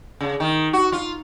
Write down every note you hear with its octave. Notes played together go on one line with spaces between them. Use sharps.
C#3
D#3
F#4
F4